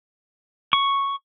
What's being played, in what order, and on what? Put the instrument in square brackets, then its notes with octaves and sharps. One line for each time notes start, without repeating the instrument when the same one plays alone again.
[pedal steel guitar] C#6